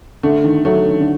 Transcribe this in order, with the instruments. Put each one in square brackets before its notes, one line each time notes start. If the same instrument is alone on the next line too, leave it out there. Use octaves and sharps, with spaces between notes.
[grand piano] D3 [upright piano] A3
[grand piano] D#3
[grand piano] D3 F#3 [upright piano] A3
[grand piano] D#3
D3